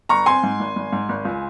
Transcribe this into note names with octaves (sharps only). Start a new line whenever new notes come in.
G1 A#5 C#6
C4 G#5 C6
G#2
G#1
G#1
G#2
G#1
C#2